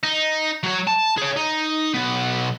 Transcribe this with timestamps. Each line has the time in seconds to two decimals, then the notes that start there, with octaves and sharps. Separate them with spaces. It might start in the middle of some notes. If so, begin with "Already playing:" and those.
0.03 D#4
0.63 F#3 C#5
0.87 A5
1.18 G#4 C#5
1.37 D#4
1.94 B1 B3